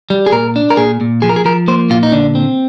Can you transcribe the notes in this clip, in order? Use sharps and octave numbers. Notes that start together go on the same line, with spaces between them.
G3
G#4
A#2 A#4
D4
A#4
A#2 G#4
A#2
F3 G#4
A#4
G#4
F3 A#4
A#3 C5
A#2 F4
D#4
D3 D4
C4